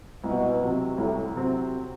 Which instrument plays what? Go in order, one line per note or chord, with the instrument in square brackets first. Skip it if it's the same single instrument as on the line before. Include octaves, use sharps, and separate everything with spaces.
[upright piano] C2 [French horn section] B2
[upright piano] C3 F#3 C4
[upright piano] C2 [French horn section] A2
[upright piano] C3 F#3 C4